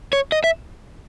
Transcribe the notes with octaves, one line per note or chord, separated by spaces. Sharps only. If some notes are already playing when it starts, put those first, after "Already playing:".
C#5
D#5
E5